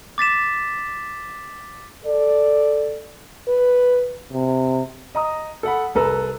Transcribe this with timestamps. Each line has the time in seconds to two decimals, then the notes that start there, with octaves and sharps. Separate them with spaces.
0.18 D6 A6 B6 E7
2.05 A4 D5
3.48 B4
4.32 C3
5.15 D#5 A#5 D#6
5.63 A4 F#5 B5
5.95 C2 A4 B4 A#5 E6